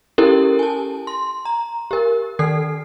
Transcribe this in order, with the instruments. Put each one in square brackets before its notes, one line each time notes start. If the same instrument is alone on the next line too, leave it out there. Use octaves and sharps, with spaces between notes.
[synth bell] C#4 E4 G4 A4 A#4
G#5 A5
C6
A#5
G4 A#4
D#3 A4 C7